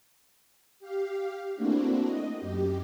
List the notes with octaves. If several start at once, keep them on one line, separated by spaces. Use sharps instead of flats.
G4 F5
A3 A#3 C4 D4 E4 F#4
D#5
F#2 G4